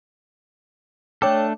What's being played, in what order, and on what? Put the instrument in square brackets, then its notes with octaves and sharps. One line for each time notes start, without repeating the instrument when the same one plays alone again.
[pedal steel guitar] A3 D4 A4 [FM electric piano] C#5 G5 D6